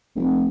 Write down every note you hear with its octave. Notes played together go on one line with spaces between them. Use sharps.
F1